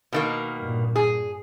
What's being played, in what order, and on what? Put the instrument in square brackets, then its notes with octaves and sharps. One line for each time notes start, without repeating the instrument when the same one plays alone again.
[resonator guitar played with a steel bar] B2 D#3 A#3
[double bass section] G2 A#2
[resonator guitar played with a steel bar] G#4